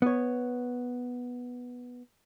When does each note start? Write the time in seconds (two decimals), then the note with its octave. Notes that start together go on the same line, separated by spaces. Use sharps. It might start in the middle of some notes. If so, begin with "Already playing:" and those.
0.02 B3 C#5